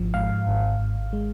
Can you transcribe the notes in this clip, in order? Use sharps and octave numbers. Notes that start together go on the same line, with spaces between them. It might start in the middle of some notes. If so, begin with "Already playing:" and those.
Already playing: G#1 F3
G#2 F5
G#1
G#1
G#3